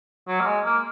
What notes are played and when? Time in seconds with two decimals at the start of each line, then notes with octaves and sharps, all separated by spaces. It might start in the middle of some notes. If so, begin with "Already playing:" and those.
0.27 F#3
0.40 A#3
0.46 G#3
0.65 A#3